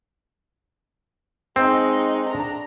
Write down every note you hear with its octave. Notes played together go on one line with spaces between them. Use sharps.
G#3 C4 D#4
D4 A#5